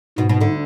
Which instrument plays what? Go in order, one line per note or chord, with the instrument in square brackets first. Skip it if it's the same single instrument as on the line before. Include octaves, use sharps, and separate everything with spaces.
[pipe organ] G#2 [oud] B2
[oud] B2
D2 D3